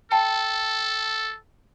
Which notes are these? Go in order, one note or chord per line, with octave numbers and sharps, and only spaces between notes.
A4 G5 A5 C#7